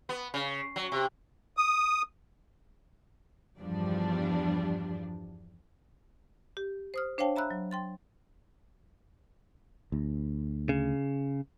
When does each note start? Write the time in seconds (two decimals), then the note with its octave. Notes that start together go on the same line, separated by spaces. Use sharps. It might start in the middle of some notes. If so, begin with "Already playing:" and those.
0.09 B3
0.34 C#3
0.76 F#3
0.92 C3
1.57 D#6
3.59 E2 G2 F3 G3 D4
6.57 G4
6.94 C5 D#6 F6
7.18 D4 C5 C#5 F5 G5 A5
7.36 E5 A#5 B5 E6 F#6
7.51 F#3
7.71 G5 C6 A6
9.92 D2
10.69 C#3